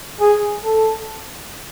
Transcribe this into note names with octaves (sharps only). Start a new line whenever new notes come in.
G#4
A4